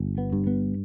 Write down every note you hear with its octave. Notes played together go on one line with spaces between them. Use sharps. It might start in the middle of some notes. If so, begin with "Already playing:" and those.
Already playing: G1
B3
G2
B3